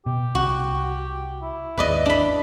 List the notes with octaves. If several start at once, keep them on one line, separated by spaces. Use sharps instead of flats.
B2 G4
C2 F#4
E4
G#1 D#2 B4 D5 D#5
D4 B5